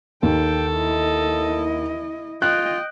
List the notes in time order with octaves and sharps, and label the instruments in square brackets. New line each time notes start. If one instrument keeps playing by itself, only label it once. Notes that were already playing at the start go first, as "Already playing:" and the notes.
[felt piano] D#2 [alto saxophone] A4 [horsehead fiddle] G5
[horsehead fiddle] E4 D#5
[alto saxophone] F4 [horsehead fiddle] D#5 G5 [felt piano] F#6